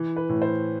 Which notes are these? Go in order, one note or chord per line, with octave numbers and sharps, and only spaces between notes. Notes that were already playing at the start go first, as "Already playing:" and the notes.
Already playing: E3
B4
A2
C5